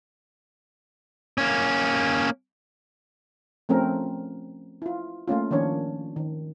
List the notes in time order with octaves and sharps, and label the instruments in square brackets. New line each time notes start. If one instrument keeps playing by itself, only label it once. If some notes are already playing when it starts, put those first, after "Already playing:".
[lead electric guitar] A#3 C#4
[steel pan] F3 A3 C4 C#4 A#4
E4 F4
A3 A#3 C#4 F4
D#3 F3 A#3 C#4 D4 C#5
D#3